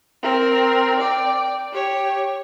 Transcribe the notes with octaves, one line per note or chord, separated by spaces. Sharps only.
C4 A#4
D5 G5
G4 C#5